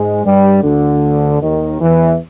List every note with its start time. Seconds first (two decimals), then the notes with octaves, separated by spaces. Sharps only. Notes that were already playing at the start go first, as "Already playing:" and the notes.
Already playing: G#2 G#3
0.25 G2 G3
0.63 D2 D3
1.41 D#2 D#3
1.80 E2 E3